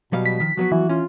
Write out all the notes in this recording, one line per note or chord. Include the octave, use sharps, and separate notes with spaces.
B2 F#3 G3 F5
B6
D#3 F3
F3 F#3 B3 F#4
E3
C#4 F4